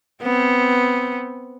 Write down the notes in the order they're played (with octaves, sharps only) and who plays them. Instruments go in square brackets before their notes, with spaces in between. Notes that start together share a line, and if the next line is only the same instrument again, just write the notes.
[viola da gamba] B3 C4